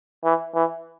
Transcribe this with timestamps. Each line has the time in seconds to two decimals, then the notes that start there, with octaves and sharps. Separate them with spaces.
0.24 E3
0.55 E3